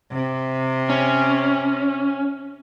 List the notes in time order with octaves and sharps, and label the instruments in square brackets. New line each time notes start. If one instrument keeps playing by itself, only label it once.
[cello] C3
[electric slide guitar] C#4